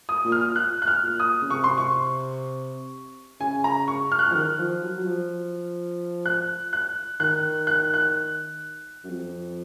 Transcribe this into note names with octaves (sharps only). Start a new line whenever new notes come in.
D#6
A#2
F6
F#6
F#6
F6
A#2
D#6
C#3
C3 C#6
C6
C#6
C#3 G#5
A#5
C#6
F6
F#6
F3 F6
D#3
F3
F#3
F#3
F3
F#6
F#6
D#3 F#6
F#6
F#6
F#2
F2